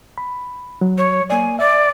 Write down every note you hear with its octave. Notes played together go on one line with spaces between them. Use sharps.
B5
F#3
C#5
A#3 D5 G#5
D5 E5